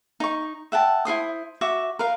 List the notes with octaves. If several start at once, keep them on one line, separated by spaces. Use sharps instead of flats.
D#4 C#6
E5 F#5 G5 A5
E4 F#4 C5 D#6
F#4 E5 C#6 D6
A#4 B4 F5